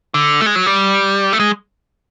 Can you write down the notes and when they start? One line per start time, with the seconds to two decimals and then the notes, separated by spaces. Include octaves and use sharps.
0.14 D3
0.41 A3
0.46 G#3
0.56 F#3
0.66 G3
1.33 A3
1.40 G#3